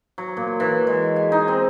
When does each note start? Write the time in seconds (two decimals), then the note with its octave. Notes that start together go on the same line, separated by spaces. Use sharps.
0.18 F#3
0.37 A#2
0.60 E3
0.87 G#3
1.16 G#5
1.32 D#4
1.48 C4